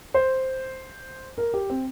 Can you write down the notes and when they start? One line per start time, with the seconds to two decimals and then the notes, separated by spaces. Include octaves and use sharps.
0.14 C5
1.38 A#4
1.54 G4
1.70 C4